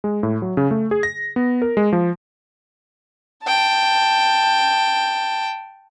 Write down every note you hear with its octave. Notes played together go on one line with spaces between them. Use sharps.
G#3
A2
F#3
C#3
A3
G#4
A#6
B3
A#4
G#3
F3
G5 A5